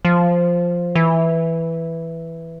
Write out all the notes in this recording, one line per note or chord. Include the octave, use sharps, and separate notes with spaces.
F3
E3